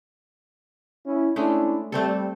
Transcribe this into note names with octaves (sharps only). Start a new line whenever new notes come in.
C#4 E4
G#3 A3 C#4 D4 E4
G3 A3 C4 A4